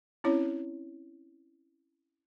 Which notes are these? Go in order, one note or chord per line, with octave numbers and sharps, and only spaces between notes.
C4 C#4 E4 C#5